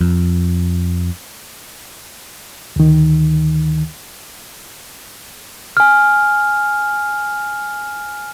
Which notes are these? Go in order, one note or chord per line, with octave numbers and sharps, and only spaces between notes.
F2
D2 D#3
G#5 F6